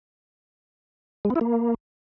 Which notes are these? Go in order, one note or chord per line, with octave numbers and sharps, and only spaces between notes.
G#3
B3
E4
A#3